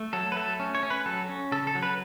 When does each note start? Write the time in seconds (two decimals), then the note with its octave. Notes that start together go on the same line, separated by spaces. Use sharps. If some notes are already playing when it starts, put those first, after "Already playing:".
Already playing: A3
0.13 F#3 A4
0.32 B4
0.36 A3 A4
0.60 C#4
0.75 C#5
0.83 C#4
0.90 B4
1.06 F#3 A4
1.29 C#4
1.52 C#3 A4
1.67 A4
1.75 F#3
1.83 B4